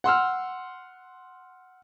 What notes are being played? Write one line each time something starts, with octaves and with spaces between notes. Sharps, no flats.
F#5 C6 E6 F6